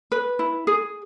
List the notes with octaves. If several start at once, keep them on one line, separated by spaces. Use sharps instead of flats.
B4
E4
G#4